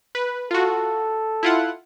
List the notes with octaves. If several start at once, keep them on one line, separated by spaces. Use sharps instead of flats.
B4
F4 F#4 A4
E4 F4 F#5